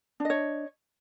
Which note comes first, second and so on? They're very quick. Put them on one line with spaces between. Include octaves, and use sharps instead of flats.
D4 D#5 C#5